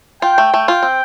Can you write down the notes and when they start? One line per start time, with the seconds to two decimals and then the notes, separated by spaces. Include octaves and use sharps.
0.22 F4 G5
0.38 A3
0.54 A3
0.68 F4 G5
0.83 C4